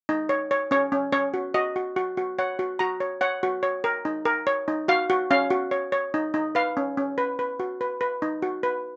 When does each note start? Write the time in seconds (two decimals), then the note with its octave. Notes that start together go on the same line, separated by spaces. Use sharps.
0.09 D#4
0.29 C#5
0.51 C#5
0.71 C#4 C#5
0.92 C#4
1.12 C#4 C#5
1.34 F#4
1.54 F#4 D#5
1.76 F#4
1.96 F#4
2.17 F#4
2.39 C#5 F#5
2.59 F#4
2.79 F#4 A#5
3.00 C#5
3.21 C#5 F#5
3.43 F#4
3.63 C#5
3.84 A#4
4.05 D#4
4.25 A#4
4.47 C#5
4.68 D#4
4.88 F#4 F5
5.10 F#4
5.31 C#4 F5
5.50 F#4
5.71 C#5
5.92 C#5
6.14 D#4
6.34 D#4
6.55 B4 F5
6.77 C#4
6.97 C#4
7.18 B4
7.39 B4
7.60 F#4
7.81 B4
8.01 B4
8.22 D#4
8.42 F#4
8.63 B4